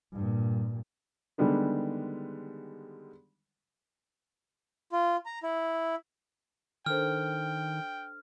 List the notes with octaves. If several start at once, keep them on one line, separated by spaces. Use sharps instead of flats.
G2 A#2
D3 D#3 G3 G#3 B3 D4
F4
A#5
E4
D#3 D4 A4 C5 G5 F6